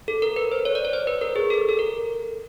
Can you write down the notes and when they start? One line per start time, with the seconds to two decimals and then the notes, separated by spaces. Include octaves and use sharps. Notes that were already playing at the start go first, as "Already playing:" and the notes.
0.08 A4
0.22 A#4
0.36 B4
0.52 C5
0.65 C#5
0.75 D5
0.85 C#5
0.93 C5
1.07 B4
1.21 A#4
1.36 G#4
1.50 A4
1.69 A4
1.79 A#4